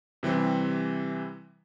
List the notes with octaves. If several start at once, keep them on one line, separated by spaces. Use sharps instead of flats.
C3 E3 G3 C4